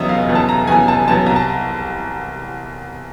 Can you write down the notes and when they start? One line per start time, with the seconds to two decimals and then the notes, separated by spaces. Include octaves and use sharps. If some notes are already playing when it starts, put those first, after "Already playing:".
Already playing: E2 C#3 F#3 B3 D#5 E5
0.09 F1 F5
0.28 E2 C#3 F#3 B3
0.35 A5
0.49 F1 A#5
0.67 E2 C#3 F#3 B3 G#5
0.87 F1 A5
1.07 E2 C#3 F#3 B3 A5
1.26 C2 A#5
1.36 A5